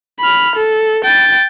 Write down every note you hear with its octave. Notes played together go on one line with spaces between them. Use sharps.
B5 F6
A4
G5 A6